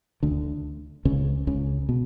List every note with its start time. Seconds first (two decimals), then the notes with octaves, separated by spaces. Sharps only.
0.23 D2 D3
1.05 C#2 C#3
1.47 C#2 C#3
1.89 B2